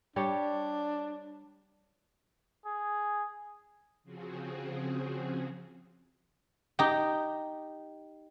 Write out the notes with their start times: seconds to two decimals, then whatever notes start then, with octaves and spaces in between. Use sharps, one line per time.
0.16 G3 D4 G4 C#5
2.66 G#4
4.03 C#3 F3 C4 F#4 G#4
6.79 D#4 G4